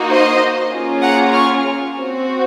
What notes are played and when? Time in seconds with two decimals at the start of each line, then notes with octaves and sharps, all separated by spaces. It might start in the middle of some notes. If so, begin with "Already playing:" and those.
Already playing: A#3 D#4 F#4
0.11 C5 D#5
0.72 A#3 C#4 F4 G#4
1.02 F#5 A#5
1.33 C#6 F6
1.94 C4 F#4